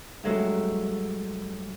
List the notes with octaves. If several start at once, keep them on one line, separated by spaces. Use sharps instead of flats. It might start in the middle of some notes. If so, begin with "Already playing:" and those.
G2 F#3 G#3 A3